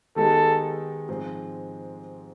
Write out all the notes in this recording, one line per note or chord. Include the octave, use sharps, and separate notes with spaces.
D#3 G#3 B3 D#4 G4 A4
G#2 F3 G#3 C4